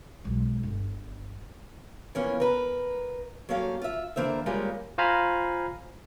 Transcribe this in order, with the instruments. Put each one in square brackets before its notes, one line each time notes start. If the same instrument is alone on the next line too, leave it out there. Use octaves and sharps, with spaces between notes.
[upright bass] B1 G#3
G1
[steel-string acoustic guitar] E3 F3 A#3 B3 C#4
A#4 B4
F#3 G3 A#3 C#4 A4 F5
F4 E5
D3 E3 A#3 C5 E5
G3 G#3 A#3 C#4 F4 G4
[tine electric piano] F4 C5 F5 G#5 A#5 B5